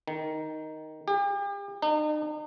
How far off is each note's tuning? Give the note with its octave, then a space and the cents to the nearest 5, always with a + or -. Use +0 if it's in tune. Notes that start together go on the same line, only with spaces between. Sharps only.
D#3 +5
G4 +40
D#4 -40